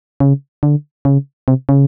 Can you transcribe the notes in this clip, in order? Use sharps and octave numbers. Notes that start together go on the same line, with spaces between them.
C#3
D3
C#3
C3
C#3